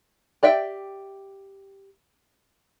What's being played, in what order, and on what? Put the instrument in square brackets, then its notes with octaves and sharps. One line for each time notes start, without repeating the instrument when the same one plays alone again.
[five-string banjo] G4 D5 E5 G5